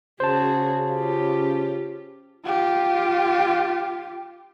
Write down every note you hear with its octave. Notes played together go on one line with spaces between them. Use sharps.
C#3 F#4 G#4 C5 A5
F4 G4
F4 G4